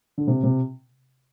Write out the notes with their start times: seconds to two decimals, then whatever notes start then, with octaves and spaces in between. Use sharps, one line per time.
0.18 D3
0.27 C3
0.43 C3